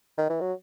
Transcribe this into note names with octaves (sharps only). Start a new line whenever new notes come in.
D#3
E3
F#3